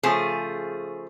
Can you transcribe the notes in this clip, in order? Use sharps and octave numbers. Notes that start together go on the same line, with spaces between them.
C#3 F3 A3 G#4